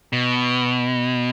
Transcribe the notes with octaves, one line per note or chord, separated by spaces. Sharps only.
B2